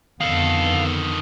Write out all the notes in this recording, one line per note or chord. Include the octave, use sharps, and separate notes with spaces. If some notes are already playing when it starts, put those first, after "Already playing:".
F2 D3 D#3 B3 A4 F5